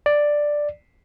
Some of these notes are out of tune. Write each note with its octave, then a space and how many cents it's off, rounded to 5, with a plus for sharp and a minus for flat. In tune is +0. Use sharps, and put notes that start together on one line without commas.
D5 +5